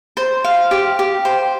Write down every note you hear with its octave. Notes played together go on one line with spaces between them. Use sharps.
C5
F5
G4
G4
C5